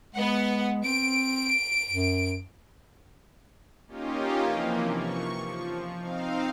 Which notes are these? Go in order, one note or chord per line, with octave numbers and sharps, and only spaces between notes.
G#3 B3 F#5
C4 D7
F#2
A#3 C#4 D#4 F4 G4
C3 E3 F3 A#3
C#6
F3
C4 D#4 F5